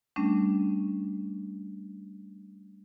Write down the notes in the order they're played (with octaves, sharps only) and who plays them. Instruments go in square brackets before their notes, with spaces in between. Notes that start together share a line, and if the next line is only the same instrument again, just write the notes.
[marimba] G3 A3 C#4 D4